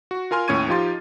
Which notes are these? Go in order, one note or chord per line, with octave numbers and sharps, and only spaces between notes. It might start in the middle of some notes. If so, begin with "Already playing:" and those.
F#4
F4 A#4 G#5 C6 F6
D#2 A2 C#4 C#6 G#6 D#7
F3 D#4 F4 G4 C6 A6